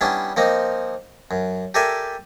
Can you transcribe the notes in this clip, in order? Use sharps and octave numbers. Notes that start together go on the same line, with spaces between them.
G3 B3 C#4 D4 E4
F3 A#3 C4 D#4
F#2
G4 A4 A#4 D5 E5 G#5